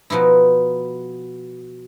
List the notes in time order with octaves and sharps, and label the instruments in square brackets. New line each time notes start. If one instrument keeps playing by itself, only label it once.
[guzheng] B2 F3 D#4 E4